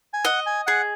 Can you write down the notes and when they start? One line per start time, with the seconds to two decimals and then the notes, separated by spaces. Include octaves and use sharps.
0.13 G#5
0.25 D#5 F#5
0.46 G#5
0.67 G#4 F#5